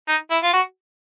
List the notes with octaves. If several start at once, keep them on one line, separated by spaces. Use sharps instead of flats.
D#4
E4
F4
F#4